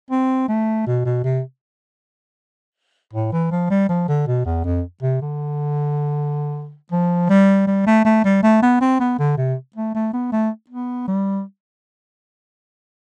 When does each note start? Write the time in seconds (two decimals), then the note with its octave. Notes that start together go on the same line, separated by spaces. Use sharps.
0.10 C4
0.48 A3
0.86 B2
1.05 B2
1.24 C3
3.13 A2
3.32 E3
3.51 F3
3.70 G3
3.89 F3
4.08 D3
4.27 B2
4.45 E2
4.64 F2
5.02 C3
5.22 D3
6.92 F3
7.30 G3
7.67 G3
7.86 A3
8.05 A3
8.24 G3
8.43 A3
8.62 B3
8.81 C4
9.00 B3
9.19 D3
9.37 C3
9.76 A3
9.95 A3
10.13 B3
10.32 A3
10.70 B3
11.07 G3